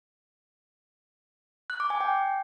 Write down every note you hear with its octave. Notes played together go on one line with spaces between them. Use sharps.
F#6
D6
G#5
G5